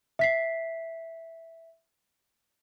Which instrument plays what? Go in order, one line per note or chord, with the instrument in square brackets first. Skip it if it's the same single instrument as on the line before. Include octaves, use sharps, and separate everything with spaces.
[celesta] E5 B6 C7